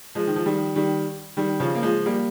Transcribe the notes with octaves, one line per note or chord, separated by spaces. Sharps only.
F3 G#3
D#3
F3
D#3 G3
D#3 G3
D#3 G3
C#3 F3
A#3
F3 G#3
G3 A#3